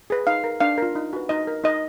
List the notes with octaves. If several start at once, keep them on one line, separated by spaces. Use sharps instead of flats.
G#4 B4
D#4 F5
A#4
D4 F5
F4 A#4
D#4
F#4 B4
D#4 D#5
A#4
D#4 D#5